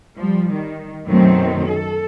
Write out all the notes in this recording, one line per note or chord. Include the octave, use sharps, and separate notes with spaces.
F3 G3
D#3
F#2 B2 D#3 F#3 A3 C4
A4